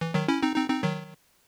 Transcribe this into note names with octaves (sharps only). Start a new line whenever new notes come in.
E3
D#3 F#3
C#4 E4
C4 D#4
C4 D#4
C4 D#4
D#3 F#3